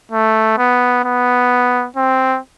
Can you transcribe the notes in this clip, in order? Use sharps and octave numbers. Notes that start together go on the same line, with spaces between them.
A3
B3
B3
C4